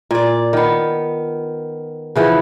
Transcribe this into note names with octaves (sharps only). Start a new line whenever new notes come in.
A#2 D5
D#3 B3
C#3 E3 F3 B3